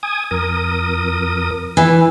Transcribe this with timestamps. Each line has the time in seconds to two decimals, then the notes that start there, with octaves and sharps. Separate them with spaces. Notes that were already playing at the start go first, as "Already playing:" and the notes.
0.03 G#5 D#6
0.31 F2 A#4 D#6
1.77 E3